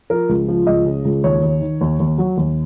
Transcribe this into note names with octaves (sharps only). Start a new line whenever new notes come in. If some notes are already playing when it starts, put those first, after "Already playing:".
F3 A#4
C#2
F3
C#2 D#5
C#3
C#2
D#2 C#5
D#2
D#3
D#2
D#2
F#3
D#2